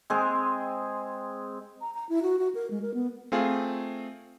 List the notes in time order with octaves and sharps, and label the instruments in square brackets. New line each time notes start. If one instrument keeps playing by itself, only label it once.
[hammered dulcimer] G#3 C4 G#4
[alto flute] A#5
A#5
E4
F#4
F#4
A#4
G#3
A#4
B3
[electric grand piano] A3 C4 F4 G#4